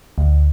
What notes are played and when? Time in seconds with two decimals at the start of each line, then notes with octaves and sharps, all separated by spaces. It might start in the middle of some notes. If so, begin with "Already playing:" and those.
0.18 D2